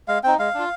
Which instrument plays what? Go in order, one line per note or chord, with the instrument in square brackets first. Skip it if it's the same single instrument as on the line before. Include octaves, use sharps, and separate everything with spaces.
[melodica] G#3 F5
C4 D#4 G5
G#3 F5
D4 F4